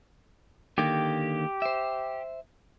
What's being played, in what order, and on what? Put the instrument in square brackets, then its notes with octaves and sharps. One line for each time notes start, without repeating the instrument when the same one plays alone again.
[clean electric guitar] D3 D#3 A#3 [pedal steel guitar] G4
[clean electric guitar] C5 E5